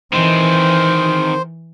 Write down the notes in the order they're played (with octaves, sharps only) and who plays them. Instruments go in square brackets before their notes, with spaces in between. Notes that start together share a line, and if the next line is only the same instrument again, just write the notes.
[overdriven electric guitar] D#3 C4 [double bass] E3 [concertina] C5